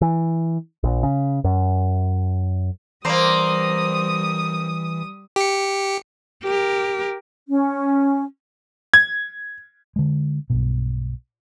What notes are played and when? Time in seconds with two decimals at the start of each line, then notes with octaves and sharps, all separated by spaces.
0.01 E3
0.84 A#1
1.03 C#3
1.44 F#2
3.05 E3 G3 A#3 C4 C5 D5 A#5 D#6
5.36 G4 C#7
6.43 G4 A#4
7.49 C#4
8.94 G#6
9.96 D3 G#3
10.50 B1 G2 B2